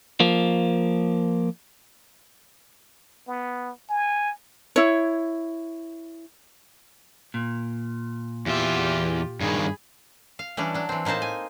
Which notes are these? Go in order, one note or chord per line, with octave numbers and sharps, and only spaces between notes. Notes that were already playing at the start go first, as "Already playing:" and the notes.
F3 A#3
B3
G#5
E4 C#5
A#2
E2 F4 G4 E5
G2 D#3 G#4 B5
F5
E3 G3 C#4 D4
F#3 D4
E3 C4
A2 A#3 D#4 C5 A5
G#5